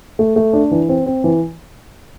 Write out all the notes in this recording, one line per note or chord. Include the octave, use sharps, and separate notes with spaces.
A3
A3
D4
E3
C4
C4
E3